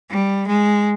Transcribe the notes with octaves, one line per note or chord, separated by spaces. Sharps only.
G3
G#3